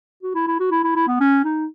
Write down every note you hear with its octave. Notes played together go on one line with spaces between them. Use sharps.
F#4
E4
E4
F#4
E4
E4
E4
B3
C#4
D#4